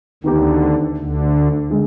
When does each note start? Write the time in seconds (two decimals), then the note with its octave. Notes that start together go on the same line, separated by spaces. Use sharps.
0.24 D2 D3 D#3 B3 D#4 G4
0.97 D2 D3
1.70 D3 G#3